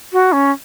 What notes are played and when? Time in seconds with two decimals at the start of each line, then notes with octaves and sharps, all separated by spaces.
0.13 F#4
0.32 C#4